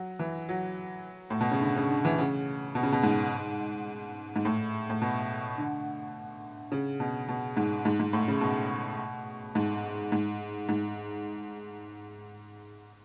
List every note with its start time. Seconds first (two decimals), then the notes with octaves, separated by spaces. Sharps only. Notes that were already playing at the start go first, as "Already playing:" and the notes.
Already playing: F#3
0.19 E3
0.49 F#3
1.30 A2
1.41 B2
1.51 C#3
1.61 D3
1.76 C#3
1.90 D3
2.05 E3
2.18 C#3
2.75 B2
2.83 C#3
2.92 B2
3.03 G#2
4.36 G#2
4.45 A2
4.90 A2
5.02 B2
5.58 D3
6.72 C#3
7.00 B2
7.28 B2
7.57 G#2
7.85 G#2
8.00 G#2
8.13 A2
8.28 C#3
8.41 B2
9.55 G#2
10.12 G#2
10.69 G#2